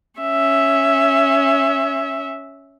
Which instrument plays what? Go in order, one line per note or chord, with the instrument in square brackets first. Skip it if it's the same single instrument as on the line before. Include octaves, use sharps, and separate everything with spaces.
[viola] C#4 E5